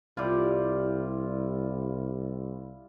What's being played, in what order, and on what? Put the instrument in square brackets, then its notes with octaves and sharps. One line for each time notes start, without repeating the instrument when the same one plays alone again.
[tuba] C2 [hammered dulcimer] G3 E4 F4